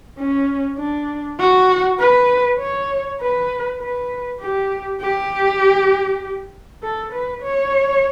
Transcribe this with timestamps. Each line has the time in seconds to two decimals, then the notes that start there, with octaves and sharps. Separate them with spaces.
0.19 C#4
0.78 D4
1.39 F#4
1.99 B4
2.60 C#5
3.21 B4
3.80 B4
4.41 G4
5.01 G4
6.83 A4
7.13 B4
7.43 C#5